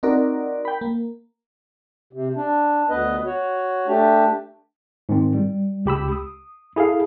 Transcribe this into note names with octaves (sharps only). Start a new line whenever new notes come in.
C4 D#4 F#4 A#4 D5
G5 B5
A#3
C3
D4
D2 B3 B4 D#5
F#4 C#5
A3 D4 G4
G#2 D#3 C4
G3
C#2 G4 B5 E6
D#6
E4 G#4 A4 F5